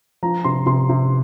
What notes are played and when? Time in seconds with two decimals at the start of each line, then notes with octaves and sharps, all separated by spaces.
0.23 F3 A#5
0.44 C3 C6
0.66 C3 C6
0.89 C3